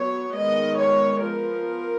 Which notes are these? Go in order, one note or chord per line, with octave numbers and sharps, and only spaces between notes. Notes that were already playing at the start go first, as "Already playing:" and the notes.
Already playing: F#3 B3 C#5
D#3 G#3 B3 D#5
C#5
F3 B3 A#4